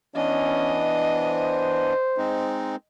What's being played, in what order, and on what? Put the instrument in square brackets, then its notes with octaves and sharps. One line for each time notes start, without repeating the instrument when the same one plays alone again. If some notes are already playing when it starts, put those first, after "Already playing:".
[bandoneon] E3 B3 D4 [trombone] C#4 [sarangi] D#5
[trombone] C5
[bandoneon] G#3 C4 D#4